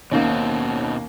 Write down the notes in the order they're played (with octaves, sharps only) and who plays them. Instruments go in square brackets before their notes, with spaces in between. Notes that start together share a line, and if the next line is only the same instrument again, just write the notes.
[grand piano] D#2 A#3 [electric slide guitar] B2 C4 [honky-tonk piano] C#4 D#4